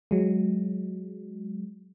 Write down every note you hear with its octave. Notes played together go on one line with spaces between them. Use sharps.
F#3 G#3